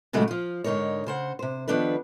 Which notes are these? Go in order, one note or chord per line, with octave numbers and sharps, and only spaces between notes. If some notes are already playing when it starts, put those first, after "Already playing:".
A#2 C#3 F#3 G#3 A3
F3 F4
G#2 D3 D#4 A#4 C#5
C#3 C5 F#5
C3 C5
D#3 F3 B3 D4 A4 B4